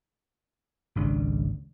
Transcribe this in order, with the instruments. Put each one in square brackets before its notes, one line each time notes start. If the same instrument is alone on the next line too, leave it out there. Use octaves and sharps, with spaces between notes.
[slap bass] G#1 C#2 D4